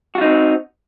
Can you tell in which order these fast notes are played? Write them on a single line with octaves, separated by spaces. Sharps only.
F#4 F4 D#4 C4